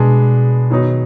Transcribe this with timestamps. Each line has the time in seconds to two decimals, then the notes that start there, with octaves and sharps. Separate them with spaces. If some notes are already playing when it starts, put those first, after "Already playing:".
Already playing: B2 G#3 B3 D4
0.70 D#3 F#3 B3 D#4